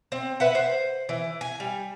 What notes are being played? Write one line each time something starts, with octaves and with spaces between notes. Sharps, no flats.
C4
B4 E5 F#5
C5
E3
G#5
G3